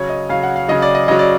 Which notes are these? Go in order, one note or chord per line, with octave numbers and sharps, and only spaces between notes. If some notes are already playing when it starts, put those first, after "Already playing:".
Already playing: C#3 F#3 C#5
D#5
C#3 F#3 F5
F#5
F5
C#3 F#3 D#5
D5
D#5
C#3 F#3 D#5
D5